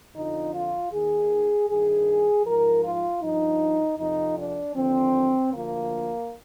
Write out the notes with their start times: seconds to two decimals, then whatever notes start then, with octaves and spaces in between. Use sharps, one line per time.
0.15 F2 D3 F3 D#4
0.54 F4
0.91 D#2 D#3 G#4
1.68 G2 D#3 G#4
2.44 G#2 F3 A#4
2.83 F4
3.21 G2 F3 D#4
3.98 F2 C3 F3 D#4
4.37 D4
4.75 D#2 D3 F3 C4
5.52 D2 D3 F3 A#3